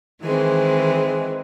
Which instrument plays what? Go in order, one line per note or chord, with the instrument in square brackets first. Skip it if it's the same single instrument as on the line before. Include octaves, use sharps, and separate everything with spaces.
[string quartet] D#3 E3 G#3 C4